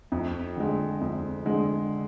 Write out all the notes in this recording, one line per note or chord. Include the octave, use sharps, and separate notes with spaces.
F2
D3 G#3
F2
D3 G#3